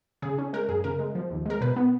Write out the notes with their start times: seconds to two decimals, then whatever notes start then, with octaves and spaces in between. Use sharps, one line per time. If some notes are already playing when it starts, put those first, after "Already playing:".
0.22 C#3 G#4
0.38 C#4
0.53 G#3 A#4
0.68 F#2 G#4
0.84 C#3 A#4
0.99 G#3
1.15 F3
1.30 D#2
1.46 G#3 A#4
1.61 B2 B4
1.76 B3